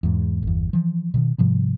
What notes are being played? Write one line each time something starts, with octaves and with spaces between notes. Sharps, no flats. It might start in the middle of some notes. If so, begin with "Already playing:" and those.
E2 G#2
G1 E2
E3 F3
B2 D3 D#3
G#2 C3 F3 G3